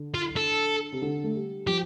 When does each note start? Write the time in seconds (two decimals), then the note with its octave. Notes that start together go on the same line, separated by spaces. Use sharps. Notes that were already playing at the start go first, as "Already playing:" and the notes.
Already playing: D3
0.14 F4
0.36 A4
0.92 C3
1.02 D3
1.24 A3
1.35 G3
1.67 F3 G4